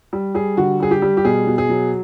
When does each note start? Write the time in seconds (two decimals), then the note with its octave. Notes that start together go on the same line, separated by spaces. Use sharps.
0.13 G3
0.35 G3 G#4
0.57 D3 F#4
0.80 G3 G#4
0.91 G4
1.02 G3
1.17 G4
1.25 B2 G#4
1.47 B2
1.58 G#4
1.69 F#3